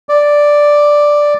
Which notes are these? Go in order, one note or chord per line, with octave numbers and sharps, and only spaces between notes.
D5